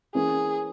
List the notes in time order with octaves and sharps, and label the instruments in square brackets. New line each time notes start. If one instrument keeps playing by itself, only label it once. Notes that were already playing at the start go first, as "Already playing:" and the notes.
[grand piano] E3 A#3 C#4 [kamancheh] G#4